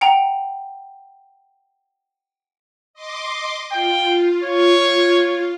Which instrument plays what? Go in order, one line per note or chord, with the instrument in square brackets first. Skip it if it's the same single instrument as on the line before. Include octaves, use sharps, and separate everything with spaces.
[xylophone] F#5 G5 A#5
[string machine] D#5 C6 D6
[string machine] F4 [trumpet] G5
[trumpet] C#5